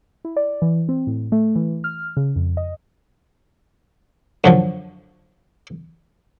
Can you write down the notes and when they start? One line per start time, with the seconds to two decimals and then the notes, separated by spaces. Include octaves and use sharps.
0.25 E4
0.36 D5
0.62 E3
0.89 C4
1.07 A2
1.32 A3
1.56 E3
1.84 F6
2.17 C#3
2.36 F2
2.57 D#5
4.44 F#2 D3 F3